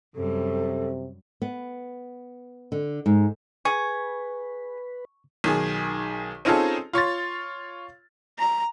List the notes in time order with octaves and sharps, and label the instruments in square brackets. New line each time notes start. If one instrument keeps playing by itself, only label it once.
[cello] F#2 G3 [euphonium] C3 [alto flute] A4
[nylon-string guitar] B3
D3
G#2
[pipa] G#4 [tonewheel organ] B4 [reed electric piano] C#6
[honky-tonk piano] B1 D#3 G#4
C4 C#4 D#4 F4 G#4 A4
F4 C#5 C6 A6
[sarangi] A#5